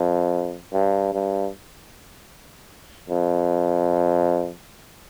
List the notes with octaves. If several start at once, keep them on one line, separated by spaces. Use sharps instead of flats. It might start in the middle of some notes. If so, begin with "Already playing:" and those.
Already playing: F2
G2
G2
F2